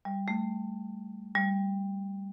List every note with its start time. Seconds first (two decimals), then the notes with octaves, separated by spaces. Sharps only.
0.05 G3
0.28 A3
1.35 G3